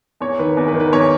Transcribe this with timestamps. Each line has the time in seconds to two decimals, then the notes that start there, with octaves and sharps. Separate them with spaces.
0.20 E2 C#5
0.39 D#3 B4
0.57 E2 B4
0.68 B4
0.74 D#3
0.80 B4
0.92 E2 C#5